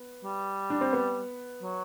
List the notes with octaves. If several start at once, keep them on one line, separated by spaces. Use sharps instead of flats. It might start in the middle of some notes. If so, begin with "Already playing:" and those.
Already playing: B3
G3
D4
C4
B3
F#3